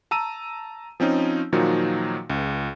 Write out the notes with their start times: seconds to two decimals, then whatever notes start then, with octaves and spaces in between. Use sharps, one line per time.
0.11 A5 A#5 E6 D#7
1.00 F3 C4 C#4 D#4
1.53 A#2 D#3 F3 F#3 D#4 F#4
2.30 C#2